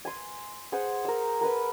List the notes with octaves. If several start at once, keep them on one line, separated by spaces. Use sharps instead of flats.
G#5 C6
G#4 C5 F#5
A#4 E6
A#4 B4 B5